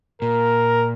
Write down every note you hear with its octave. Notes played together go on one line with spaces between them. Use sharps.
A#2 A#4